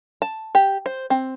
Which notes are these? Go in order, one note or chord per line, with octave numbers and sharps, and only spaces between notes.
A5
G4
C5
C4